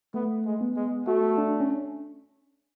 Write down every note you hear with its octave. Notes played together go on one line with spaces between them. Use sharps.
A3 B3
G#3
B3
G#3
A3 F#4
D4
C#4